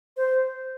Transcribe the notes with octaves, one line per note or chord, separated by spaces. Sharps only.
C5